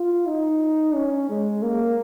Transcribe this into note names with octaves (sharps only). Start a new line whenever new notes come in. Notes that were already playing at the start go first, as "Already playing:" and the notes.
Already playing: F4
D#4
C#4
G#3
A#3